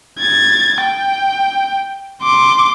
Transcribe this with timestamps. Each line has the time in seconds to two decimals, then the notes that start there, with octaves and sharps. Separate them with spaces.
0.19 G#6 A6
0.82 G5
2.23 C6 D6